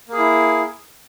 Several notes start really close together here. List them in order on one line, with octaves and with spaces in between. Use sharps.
A#3 G#4 E4